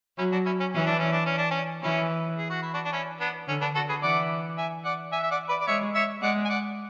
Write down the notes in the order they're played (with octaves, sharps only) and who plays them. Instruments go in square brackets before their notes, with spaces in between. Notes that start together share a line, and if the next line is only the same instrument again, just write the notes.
[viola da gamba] F#3 [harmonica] C#4 E4
[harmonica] D4 F#4
C#4 E4
C#4
[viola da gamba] E3 [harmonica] C#4
[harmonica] D4
C#4
D4
C#4
D4
C#4
[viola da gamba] E3 [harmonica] C#4 E4
[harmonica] G#4
F#4
E4
D4 F#4
D4
C#4 E4
B3 D4
[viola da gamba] D3 [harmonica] C#4
[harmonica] B3 D4
F#4 A4
G#4 B4
[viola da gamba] E3 [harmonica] D5 F#5
[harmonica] E5 G#5
D5 F#5
E5 G#5
E5
D5 F#5
B4 D5
D5
[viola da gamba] G#3 [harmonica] C#5 E5
[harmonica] C#5 E5
[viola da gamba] G#3 [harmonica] D5 F#5
[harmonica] G#5
D5 F#5